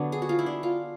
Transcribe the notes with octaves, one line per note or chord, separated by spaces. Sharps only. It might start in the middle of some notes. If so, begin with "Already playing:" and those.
Already playing: D3 F#3 B3 D4
G#4
F#4
F4
E4
D4
F4